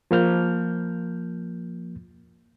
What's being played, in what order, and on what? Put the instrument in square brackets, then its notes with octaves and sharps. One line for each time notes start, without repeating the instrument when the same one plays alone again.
[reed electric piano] F3 A#3 F6 G6